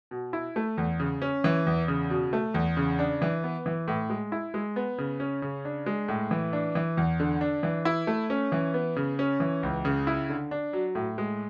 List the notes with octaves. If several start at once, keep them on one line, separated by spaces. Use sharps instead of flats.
B2
E4
A3
E2
C#3
C#4
E3
E2
C#3
B2
A3
E2
C#3
D4
E3
B3
E3
A2
G#3
E4
G#3
B3
C#3
C#4
C#3
D4
G#3
A2
E3
D4
E3
E2
D3
D4
E3
E4
A3
C#4
E3
B3
C#3
C#4
E3
C#2
C#3
E4
D3
D4
F#3
A2
G#3